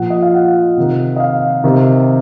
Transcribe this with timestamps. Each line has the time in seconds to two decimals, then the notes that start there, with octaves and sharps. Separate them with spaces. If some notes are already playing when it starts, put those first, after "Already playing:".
Already playing: A#2 F3 F#5
0.10 D#5
0.22 F5
0.34 F#5
0.77 C3 D#3
1.16 D#5
1.20 F5
1.64 C3 D#3